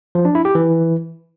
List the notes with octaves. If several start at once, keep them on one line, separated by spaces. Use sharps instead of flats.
F3
D4
E4
G4
E3